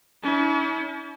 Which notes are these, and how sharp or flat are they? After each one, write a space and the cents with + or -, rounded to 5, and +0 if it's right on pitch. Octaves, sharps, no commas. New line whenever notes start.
C#4 +45 E4 -35